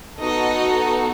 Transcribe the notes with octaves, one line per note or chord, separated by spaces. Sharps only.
B3 D#4 F#4 A4 D#5